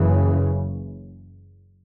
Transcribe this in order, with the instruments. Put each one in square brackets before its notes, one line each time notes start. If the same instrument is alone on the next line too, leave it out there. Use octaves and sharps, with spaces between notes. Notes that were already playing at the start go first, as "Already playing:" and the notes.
Already playing: [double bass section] F#1 F#2 C#3 E3